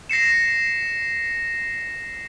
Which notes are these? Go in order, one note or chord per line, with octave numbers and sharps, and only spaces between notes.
A#6 C7 C#7 E7